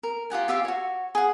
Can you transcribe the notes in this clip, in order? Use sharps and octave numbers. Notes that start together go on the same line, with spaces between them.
A#4
F4 G4 F#5 G#5
F4 G4 E5 F5
F#4 C#5
G#4 F#5